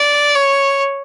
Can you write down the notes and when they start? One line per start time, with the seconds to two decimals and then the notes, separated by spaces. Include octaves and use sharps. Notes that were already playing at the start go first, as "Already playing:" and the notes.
Already playing: D5
0.35 C#5